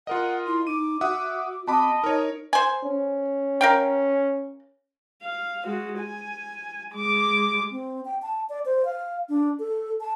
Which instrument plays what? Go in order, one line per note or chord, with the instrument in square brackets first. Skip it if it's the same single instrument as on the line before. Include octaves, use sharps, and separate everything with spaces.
[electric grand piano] F4 A#4 D#5 [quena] F#5
[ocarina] E4 [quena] C6
[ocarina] D#4 [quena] D6 [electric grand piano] D#7
[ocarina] F#4 [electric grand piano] E5 F#5 D#6
[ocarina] C4 [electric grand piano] F#4 B5 D6 [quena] D#5 [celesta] A5
[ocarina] D#4 [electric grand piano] A#4 C#5
[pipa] C5 G#5
[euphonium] C#4
[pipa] A#4 F5 G5
[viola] F5
G#3 F#4
G#5
G#3 D6
[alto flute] C4
G5
A5
D5
C5
F5
D4
A4
A5